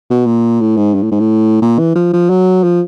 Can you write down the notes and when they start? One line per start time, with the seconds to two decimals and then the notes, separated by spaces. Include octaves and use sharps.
0.10 B2
0.26 A#2
0.61 A2
0.77 G#2
0.95 G2
1.03 A2
1.12 G#2
1.20 A2
1.62 A#2
1.79 E3
1.96 F3
2.13 F3
2.30 F#3
2.64 F3